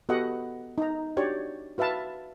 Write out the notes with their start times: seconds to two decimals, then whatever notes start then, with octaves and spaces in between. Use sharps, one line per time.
0.09 B3 F#4 G4 A4 D#5 F#5
0.78 D#4 A#5
1.17 D4 F#4 G4 C#5 D5
1.78 F#4 B4 E5 F5 A5